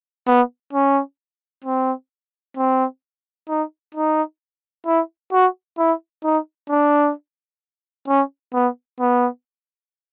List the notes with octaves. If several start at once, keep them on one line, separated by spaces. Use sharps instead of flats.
B3
C#4
C4
C4
D#4
D#4
E4
F#4
E4
D#4
D4
C#4
B3
B3